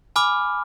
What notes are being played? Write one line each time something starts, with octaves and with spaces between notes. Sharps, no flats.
G#5 B5 D6 F6